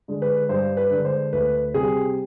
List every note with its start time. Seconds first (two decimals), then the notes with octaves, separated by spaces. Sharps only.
0.08 D3 G#3
0.22 B4
0.49 G2 C5
0.77 B4
0.91 D3
0.96 G#3
1.05 C5
1.33 D2 B4
1.74 C3 G3 G#4